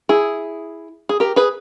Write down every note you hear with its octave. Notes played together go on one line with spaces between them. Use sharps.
E4 G#4
G#4
G4 A#4
G#4 B4